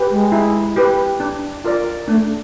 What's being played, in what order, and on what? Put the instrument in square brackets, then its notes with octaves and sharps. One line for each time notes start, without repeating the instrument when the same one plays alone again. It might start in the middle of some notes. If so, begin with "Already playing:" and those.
Already playing: [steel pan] G4 B4
[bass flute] G#3
[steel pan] E4
G4 B4
D4
F4 A#4 D5
[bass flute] A3 [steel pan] D4